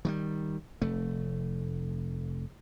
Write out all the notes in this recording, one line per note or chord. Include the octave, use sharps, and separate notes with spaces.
D#3 F#3 G3
F1 A3